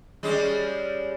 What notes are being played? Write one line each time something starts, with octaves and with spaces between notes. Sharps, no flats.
G3 G#3 C#4